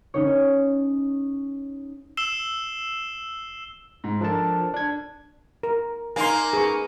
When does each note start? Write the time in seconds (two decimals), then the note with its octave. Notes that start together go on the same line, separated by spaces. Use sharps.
0.14 C#4 D#4 C#5
2.17 E6 C7 E7 G7
4.04 G#2
4.21 F3 D4 A4 A#4 A5
4.74 D4 G#6
5.63 A#4
6.16 A#3 D#4 G#5 C6
6.53 G#4 B4 C#6